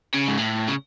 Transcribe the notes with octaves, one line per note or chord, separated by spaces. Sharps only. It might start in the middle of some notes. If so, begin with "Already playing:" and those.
C#3
G#2
A2
C#3